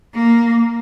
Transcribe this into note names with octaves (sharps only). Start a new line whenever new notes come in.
A#3